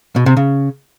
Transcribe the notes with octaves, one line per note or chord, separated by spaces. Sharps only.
B2
C3
C#3